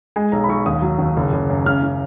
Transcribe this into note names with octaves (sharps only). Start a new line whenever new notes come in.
G#3 G#5
B1 A#5
B5
B1 C#6
D#2 D#6
F#3
D#2
F#1
F#1
F#2
C#3 F6
C#3